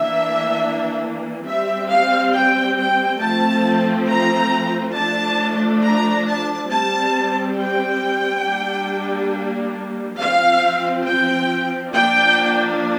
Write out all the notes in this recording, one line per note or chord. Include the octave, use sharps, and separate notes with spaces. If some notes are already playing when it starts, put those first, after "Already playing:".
Already playing: E3 A#3 D4 E5
G3 C4 E5
F5
G5
G5
F3 A3 C4 A5
A#5
F3 A3 D4 A5
A#5
A5
G3 C4 A5
G5
G3 A#3 D4
F3 C4 F5
G5
F3 A#3 D4 G5